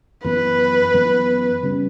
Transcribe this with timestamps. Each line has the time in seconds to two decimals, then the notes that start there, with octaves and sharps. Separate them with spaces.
0.24 F#2 E3 B3 B4
0.94 F#2 E3 B3
1.63 C#3 G3 C#4